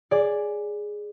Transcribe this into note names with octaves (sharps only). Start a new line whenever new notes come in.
G#4 D5